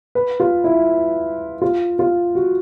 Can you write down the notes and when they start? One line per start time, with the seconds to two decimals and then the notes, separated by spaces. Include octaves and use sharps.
0.15 B4
0.40 F4
0.64 E4
1.62 F4
1.99 F4
2.35 F#4